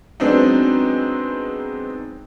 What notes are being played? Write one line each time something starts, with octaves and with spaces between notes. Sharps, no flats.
F#3 G#3 B3 C4 D4 D#4